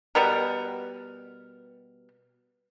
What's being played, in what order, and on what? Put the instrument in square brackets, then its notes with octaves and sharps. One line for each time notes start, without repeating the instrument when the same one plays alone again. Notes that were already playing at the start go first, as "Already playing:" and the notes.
[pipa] B2 G3 B3 A#4